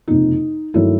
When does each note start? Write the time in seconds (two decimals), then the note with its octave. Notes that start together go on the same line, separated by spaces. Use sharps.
0.08 F#1 F2 C3 D#4
0.74 G2 D#3 F#3 A3 E4